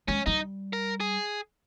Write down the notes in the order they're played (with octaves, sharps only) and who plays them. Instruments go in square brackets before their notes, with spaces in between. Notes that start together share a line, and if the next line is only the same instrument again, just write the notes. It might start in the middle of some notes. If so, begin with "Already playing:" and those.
[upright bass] G#3 [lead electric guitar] C#4
[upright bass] G3 [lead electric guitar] D#4
[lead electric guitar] A#4
G#4